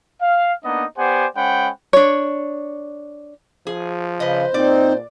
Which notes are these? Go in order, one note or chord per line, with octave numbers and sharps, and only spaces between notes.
F5
A#3 B3 D4 D#4 D#5
B3 G4 C5 D5 F#5 G#5
G#3 C#4 C5 F#5 G5 B5
D4 C#5
F3 G#4
C#3 B4 C5 D#5
A#2 C4 D#4 D5